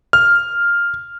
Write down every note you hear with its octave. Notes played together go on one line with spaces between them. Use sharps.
F6